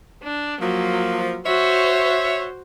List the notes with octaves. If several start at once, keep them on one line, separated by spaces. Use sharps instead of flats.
D4
F3 F#3 A#3
F#4 C5 C#5 E5